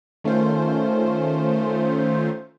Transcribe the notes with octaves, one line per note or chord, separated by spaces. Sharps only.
D#3 A3 C#4 F4 C5